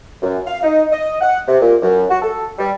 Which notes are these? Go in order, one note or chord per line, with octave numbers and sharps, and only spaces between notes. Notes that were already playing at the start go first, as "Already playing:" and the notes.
F#2
F5
D#4
D#5
F#5
C3
A#2
F#2
F#4
A4
G3